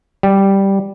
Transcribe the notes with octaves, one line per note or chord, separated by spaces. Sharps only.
G3